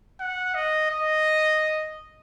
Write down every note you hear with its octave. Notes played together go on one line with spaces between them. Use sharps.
F#5
D#5
D#5